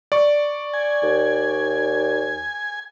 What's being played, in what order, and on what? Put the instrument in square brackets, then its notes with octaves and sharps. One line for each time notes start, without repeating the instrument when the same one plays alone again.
[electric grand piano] D5 C#6
[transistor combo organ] G#5
[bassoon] D#2